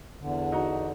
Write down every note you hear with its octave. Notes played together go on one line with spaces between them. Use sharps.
E2 D3
D#4 F#4 A#5